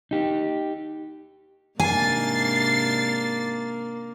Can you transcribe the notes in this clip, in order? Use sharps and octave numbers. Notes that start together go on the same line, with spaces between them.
D#4 G4
G#2 C3 A#3 D4 G#5 A6 C7